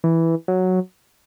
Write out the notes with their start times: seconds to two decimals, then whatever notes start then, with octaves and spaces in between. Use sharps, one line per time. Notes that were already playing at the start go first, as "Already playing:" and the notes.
0.04 E3
0.48 F#3